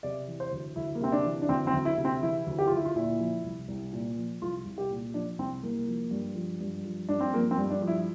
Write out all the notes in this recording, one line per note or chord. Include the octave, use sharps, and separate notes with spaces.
C3 D5
E3
C5
D2
D2 E4
A#3
C3 C4
D4
E3
D4
D2 C4
C4
D2
E4
C3
C4
E3 E4
D2
G4
D2 F4
E4
F4
A#2 E4
F3
C2
C2
A#2
F3
C2 F4
C2
G4
A#2
F3 D4
C2 C4
C2 A#3
F3
G2
F3
G2
F3
G2 D4
C4
F3 A#3
C4
G2
D4
F3
E4